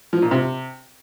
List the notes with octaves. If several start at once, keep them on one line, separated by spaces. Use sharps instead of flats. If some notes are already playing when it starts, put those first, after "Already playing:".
F3
A#2
C3